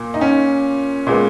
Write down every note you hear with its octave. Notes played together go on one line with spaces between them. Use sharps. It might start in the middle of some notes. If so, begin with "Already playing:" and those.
Already playing: A#2 A#3
D#4
C#4
A#2 G#3 B3